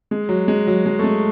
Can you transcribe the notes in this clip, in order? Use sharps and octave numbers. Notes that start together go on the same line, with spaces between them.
G#3
F#3
G#3
F#3
G#3
A3
G#3